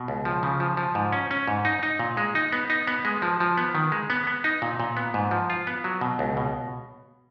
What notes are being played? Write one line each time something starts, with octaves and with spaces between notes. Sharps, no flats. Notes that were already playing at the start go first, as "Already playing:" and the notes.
Already playing: B2
C#2
F3
C#3
F3
F3
G#2
C#4
C#4
G#2
D#4
D#4
A#2
G#3
D#4
B3
D#4
B3
G#3
F3
F3
B3
D#3
G#3
B3
B3
D#4
A#2
A#2
B3
G#2
F3
F4
B3
F#3
B2
C#2
B2